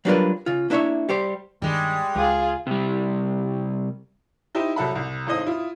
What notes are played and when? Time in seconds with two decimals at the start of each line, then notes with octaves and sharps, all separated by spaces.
0.05 F#3 G3 D4 F4 A#4 B4
0.46 C#3 F4
0.70 A#3 D4 E4 C5 C#5 E5
1.09 G3 G4 C5
1.62 G2 D#3 G3 G#3
2.15 C#2 F4 G#4
2.67 C3 G3
4.55 D#4 E4 G4 C5 E5
4.76 C2 F#3 A4 E5 F#5 B5
4.95 C2
5.27 G#1 A2 C4 D#5 D#6
5.46 E4 F4